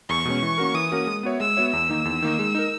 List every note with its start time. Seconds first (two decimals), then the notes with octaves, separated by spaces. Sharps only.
0.09 E2 C#6
0.25 B2 G#3 C#4
0.42 E3
0.58 A#3 C#4 F#4 A#4
0.74 E3 D#6
0.92 A#3 C#4 F#4 A#4
1.07 G#3
1.23 B3 F#4 C#5 E5
1.40 G#3 E6
1.57 B3 F#4 C#5 E5
1.72 E2 E6
1.89 D#3 A#3 D#4
2.05 E2
2.22 D#3 A#3 D#4
2.39 G#3
2.55 D#4 A#4